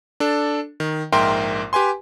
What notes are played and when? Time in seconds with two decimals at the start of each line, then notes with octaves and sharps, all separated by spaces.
0.20 D4 A4
0.80 D#3
1.12 A#1 G#2 A#4 E5 G5 C6
1.73 G4 B4 G#5 C6